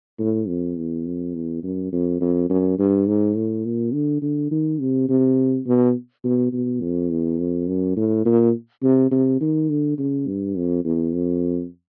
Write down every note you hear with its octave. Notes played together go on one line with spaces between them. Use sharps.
A2
F2
E2
F2
E2
F#2
F2
F2
F#2
G2
G#2
A2
A#2
D3
D3
D#3
C3
C3
B2
B2
B2
F2
E2
F2
F#2
A2
A#2
C3
C3
D#3
D3
C#3
G2
F2
E2
F2